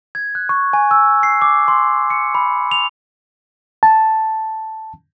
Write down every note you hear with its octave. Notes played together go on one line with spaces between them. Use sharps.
G#6
F#6
C#6
G#5
E6
C7
D6
C6
C#7
B5
F7
A5